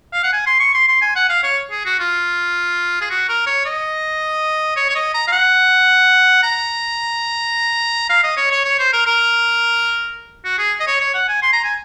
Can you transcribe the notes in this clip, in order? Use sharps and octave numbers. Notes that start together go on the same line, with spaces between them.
F5
F#5
G#5
C6
C#6
C6
C6
G#5
F#5
F5
C#5
G#4
F#4
F4
G#4
F#4
A#4
C#5
D#5
C#5
C#5
D#5
A#5
F5
F#5
A#5
F5
D#5
C#5
C#5
C#5
C5
A#4
A#4
F#4
G#4
D#5
C#5
C#5
F#5
G#5
C6
A#5
G#5